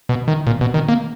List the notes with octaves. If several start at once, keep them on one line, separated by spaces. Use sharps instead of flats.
B2
D#3
A#2
B2
D#3
A#3